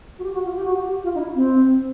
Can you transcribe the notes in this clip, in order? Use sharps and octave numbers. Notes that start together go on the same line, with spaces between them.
F#4
G4
F#4
F4
G4
F#4
G4
G4
F4
D#4
E4
C4